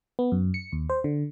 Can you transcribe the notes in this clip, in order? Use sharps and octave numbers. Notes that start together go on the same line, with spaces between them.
B3
F#2
C#7
D#2
C5
D3